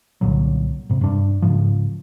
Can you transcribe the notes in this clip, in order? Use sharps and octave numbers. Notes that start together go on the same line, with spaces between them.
C2 A#2 D3 F#3
G#2 C3
G2 D4
G#2 C#3 F3